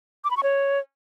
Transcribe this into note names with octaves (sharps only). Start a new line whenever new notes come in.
D6
B5
C#6
C#5